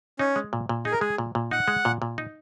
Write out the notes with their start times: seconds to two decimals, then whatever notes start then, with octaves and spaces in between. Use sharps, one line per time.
0.19 C#4 D#4
0.36 G#3
0.53 A#2
0.69 A#2
0.85 D#4 G#4
0.92 A#4
1.00 G#3 G#4
1.18 A#2
1.35 A#2
1.51 D#4 F#5
1.68 G#3
1.85 A#2
2.02 A#2
2.18 D#4